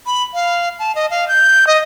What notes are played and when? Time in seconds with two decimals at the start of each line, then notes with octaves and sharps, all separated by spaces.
0.06 B5
0.34 F5
0.79 A5
0.95 D#5
1.11 F5
1.28 G6
1.67 D#5